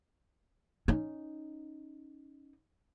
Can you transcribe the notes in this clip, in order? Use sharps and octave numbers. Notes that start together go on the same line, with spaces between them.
C#4 D#4